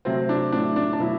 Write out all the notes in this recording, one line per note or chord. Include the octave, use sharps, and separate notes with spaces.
C3 F#3 A3 C4
D4
A2 F#3 A3 D4
D4
D4
B2 F#3 A3 E4